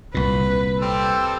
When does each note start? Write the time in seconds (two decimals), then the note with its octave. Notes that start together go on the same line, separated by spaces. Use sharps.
0.14 C2 A#2 B4
0.80 G3 C4 A4